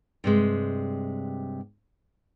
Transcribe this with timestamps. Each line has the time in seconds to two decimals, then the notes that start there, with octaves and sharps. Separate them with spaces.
0.24 G2 C3 G#3